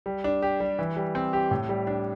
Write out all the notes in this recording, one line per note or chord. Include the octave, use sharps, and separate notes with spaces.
G3
D4
G4
G3
E3
G3
C4
G4
A2
G3
D4